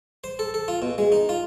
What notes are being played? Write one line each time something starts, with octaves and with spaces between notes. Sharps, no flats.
C5
A4
A4
F4
B2
G#3
D#4
F4